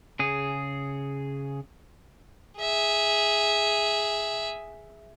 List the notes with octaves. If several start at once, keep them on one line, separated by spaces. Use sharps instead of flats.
C#3 G#4
G#4 E5